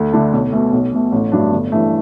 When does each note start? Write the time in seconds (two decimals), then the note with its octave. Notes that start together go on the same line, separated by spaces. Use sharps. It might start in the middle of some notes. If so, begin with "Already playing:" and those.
Already playing: D2
0.13 D3 A3 D4
0.33 B1
0.53 B2 A3
0.72 B1
0.93 B2 A3
1.12 A1
1.32 G2 F#3 A3 D4
1.52 G1
1.72 G2 E3 A3